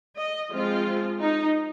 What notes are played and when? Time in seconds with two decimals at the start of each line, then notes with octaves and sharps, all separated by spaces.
0.17 D#5
0.51 F3 G#3 C4 F4
1.20 D#4